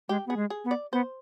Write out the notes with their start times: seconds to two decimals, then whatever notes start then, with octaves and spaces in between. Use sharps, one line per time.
0.09 G#3 G4
0.26 B3 G#4
0.37 G#3
0.50 G#4
0.65 B3
0.71 D5
0.93 B3 C5